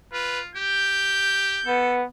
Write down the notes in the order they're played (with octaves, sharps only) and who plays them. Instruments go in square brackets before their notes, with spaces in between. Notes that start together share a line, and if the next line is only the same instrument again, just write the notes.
[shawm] F4 [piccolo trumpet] B4
[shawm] G4 [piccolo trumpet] G6
[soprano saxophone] B3 [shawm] A4